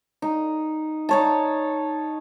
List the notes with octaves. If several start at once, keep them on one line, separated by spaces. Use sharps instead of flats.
D#4
D#4 C#5 A5